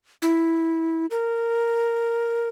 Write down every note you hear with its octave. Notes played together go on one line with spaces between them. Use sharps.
E4
A#4